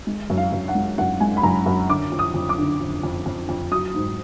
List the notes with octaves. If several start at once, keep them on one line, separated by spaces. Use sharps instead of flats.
G#3
F#2
F5
F#2
F#5
G#3
F#2 F#5
G#3 G#5
B5
F#2 A#5
F#2
D3 D6
F2
D#6
F2
D6
D3
F2
F2
F2
F2
F#3 D#6
G#2